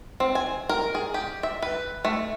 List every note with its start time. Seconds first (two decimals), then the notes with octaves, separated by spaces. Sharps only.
0.20 C4
0.35 G#5
0.69 A#4
0.95 G#4
1.14 G4
1.43 E5
1.62 B4
2.05 A3